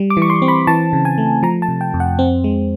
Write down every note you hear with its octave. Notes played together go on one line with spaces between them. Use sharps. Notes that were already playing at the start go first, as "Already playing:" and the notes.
Already playing: G3
D6
E3
C#6
C6
C4
B5
E3 A5
C#3
G#5
A3
F3 A#5
A5
C3
G5
F2
F#5
C4
G#3